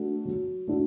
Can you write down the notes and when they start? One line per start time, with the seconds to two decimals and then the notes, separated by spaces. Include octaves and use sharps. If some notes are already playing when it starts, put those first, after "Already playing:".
Already playing: A3 D4 F#4
0.25 F#3
0.67 A3 D4 F#4